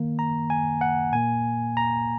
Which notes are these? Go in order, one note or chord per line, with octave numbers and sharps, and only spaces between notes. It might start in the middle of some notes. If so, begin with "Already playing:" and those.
Already playing: D#3 A#3
A#5
G#5
F#5
A#2 A#3 G#5
A#5